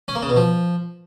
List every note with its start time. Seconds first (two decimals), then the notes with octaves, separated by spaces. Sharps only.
0.08 C#4
0.15 A#3
0.22 C#3
0.29 B2
0.36 F3